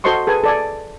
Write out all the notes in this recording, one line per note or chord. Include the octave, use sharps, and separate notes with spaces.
F#4 A4 C5 D#5 C6 C#6
G#4 A4 B4 G#5
A4 D5 G#5